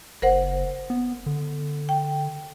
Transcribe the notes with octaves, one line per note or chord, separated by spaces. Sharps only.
F#1 A#4 C5 F#5
B3
D3
G5